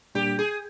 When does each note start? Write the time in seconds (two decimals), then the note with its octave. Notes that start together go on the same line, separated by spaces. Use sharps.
0.15 A#2 G3 A#3 D4 G4
0.39 G#4